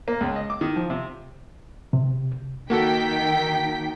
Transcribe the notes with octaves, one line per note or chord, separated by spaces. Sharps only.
A#3
C#2
D#5
D6
D#3
F3
C3
C3
D#3 A#3 F#4 A4 G5 B6